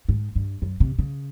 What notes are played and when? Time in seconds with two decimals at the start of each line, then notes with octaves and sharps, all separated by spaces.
0.09 G#2
0.36 G2
0.62 F#2
0.80 C3
0.99 C#3